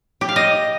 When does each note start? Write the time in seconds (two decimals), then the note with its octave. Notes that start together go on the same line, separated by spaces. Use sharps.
0.21 G4
0.29 F5
0.36 D#5